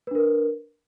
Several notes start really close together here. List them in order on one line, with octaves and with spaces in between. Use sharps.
B4 D4 A#4